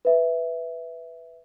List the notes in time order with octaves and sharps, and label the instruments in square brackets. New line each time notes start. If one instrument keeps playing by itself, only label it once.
[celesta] B4 E5